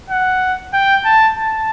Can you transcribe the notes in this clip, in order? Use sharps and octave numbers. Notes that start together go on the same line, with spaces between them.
F#5
G5
A5
A5